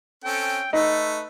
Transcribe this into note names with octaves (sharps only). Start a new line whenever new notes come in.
C4 C#4 A4 G5
A3 D#4 B4